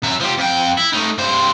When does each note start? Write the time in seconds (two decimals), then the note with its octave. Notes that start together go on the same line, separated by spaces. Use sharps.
0.03 F#3 E5
0.20 F3 G4
0.38 F2 G5
0.77 E4
0.93 A3 D#4
1.18 G2 C5